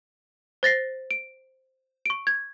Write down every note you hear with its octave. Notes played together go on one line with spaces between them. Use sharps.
C5 A6 A#6 C7
D7
C#6 D7
G#6